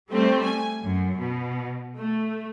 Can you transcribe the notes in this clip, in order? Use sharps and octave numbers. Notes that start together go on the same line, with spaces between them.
G3 A3 C4
G#5
F#2
B2
A3